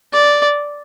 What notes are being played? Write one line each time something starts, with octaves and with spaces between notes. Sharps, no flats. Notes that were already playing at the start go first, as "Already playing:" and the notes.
D5